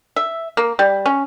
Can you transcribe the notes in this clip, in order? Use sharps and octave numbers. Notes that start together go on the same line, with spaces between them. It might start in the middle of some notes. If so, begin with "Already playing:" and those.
E5
A#3
G3
C#4